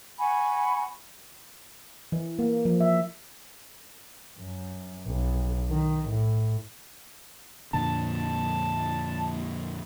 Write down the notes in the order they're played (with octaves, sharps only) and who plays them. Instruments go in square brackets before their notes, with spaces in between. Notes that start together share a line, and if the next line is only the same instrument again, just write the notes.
[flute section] F#5 G#5 B5 C#6
[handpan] E3
A#3
F3
E5
[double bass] F#2
B1
D#3
A2
[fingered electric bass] F2 A#2 D3 [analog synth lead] A5